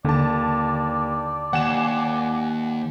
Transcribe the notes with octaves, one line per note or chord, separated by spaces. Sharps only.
D#2 D3 D5 A5
D#2 F#5 G#5 E7